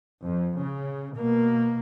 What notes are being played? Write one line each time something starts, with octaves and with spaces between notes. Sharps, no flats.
F2
C#3
B2 A#3